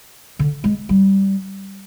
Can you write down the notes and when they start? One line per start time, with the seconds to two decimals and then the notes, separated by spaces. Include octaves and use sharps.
0.39 D3
0.64 G#3
0.89 G3